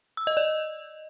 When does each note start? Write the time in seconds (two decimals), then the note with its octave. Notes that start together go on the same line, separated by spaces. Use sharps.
0.17 E6
0.27 D#5
0.37 D5